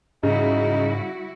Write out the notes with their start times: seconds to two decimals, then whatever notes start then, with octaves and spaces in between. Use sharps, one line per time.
0.23 G#2 C#3 G3 D#4 E4 F#4